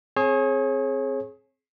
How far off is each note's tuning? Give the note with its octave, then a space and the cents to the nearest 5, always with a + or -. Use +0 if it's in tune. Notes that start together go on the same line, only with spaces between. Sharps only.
C4 +0 G#4 +20 C#5 -30